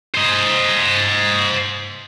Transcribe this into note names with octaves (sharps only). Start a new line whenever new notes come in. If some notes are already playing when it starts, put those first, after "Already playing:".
C5 D#5